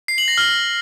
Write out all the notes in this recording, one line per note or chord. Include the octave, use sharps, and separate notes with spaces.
C7
F#7
A#6
F6